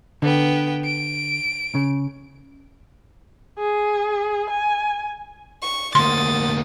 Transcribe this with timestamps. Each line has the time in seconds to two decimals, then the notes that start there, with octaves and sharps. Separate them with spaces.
0.22 D3 B3 G5
0.84 D7
1.75 C#3
3.59 G#4
4.49 G#5
5.62 C#6
5.95 D2 A#3 C6 D#6 A6